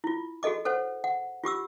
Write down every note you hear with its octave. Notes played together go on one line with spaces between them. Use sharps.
E4 F4
F#4 G#4 A4 D#5 D6
A4 C5 C#5 F#5
F#5
F4 G4 D6 E6